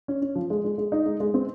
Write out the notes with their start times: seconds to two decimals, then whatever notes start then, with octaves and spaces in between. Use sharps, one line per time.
0.08 C#4
0.22 C#4
0.36 F3
0.50 G#3
0.65 G#3
0.78 G#3
0.92 D#4
1.06 G#3
1.20 G#3
1.34 C4